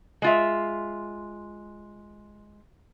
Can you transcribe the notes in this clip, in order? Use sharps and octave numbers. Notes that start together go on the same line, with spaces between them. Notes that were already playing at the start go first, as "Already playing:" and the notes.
G#3 F4 E5